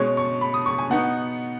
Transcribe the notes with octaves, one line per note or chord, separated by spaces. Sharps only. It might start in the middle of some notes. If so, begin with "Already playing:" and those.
Already playing: B2 G#3 C#4 C#5
C#6
B5
D#6
C#6
G#5
B2 B3 D#4 F#5